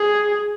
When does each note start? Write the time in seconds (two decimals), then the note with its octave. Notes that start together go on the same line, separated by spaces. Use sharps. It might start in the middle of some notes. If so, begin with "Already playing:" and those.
Already playing: G#4